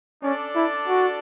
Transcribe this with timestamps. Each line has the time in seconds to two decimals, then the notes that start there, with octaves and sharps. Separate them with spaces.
0.23 C#4 D4 A4 D5
0.56 E4
0.88 F#4